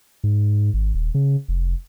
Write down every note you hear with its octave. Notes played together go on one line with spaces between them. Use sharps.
G#2
G#1
D#1
C#3
F1